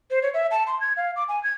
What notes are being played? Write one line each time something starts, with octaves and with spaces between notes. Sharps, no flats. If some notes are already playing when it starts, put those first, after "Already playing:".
C5
C#5
E5
A5
C6
G#6
F5
D6
G#5
G#6